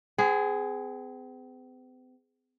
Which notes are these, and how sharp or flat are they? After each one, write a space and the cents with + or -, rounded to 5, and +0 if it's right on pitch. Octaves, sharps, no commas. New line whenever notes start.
C4 -45 G#4 +0